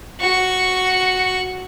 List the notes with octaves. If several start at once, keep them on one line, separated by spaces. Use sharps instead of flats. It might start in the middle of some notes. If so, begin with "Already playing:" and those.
F#4 C#6